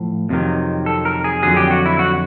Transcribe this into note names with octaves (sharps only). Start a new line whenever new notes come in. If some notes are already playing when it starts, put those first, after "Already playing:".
Already playing: A2 F3
F2 C3 D#3 F#3
A4
A#4
G#4
F2 D3 F#3 G#4
G4
F#4
E4
F#4